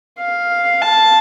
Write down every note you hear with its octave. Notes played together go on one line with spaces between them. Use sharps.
F5
A5